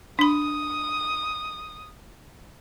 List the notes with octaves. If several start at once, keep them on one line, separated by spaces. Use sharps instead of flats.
D4 B5 D#6